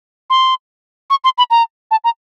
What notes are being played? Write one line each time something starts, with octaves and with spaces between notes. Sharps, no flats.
C6
C#6
C6
B5
A#5
A5
A#5